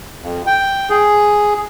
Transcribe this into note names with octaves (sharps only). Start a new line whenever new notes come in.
F2
G5
G#4